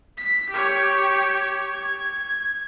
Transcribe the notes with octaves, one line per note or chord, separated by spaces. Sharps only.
B6
G4 C#5
G#6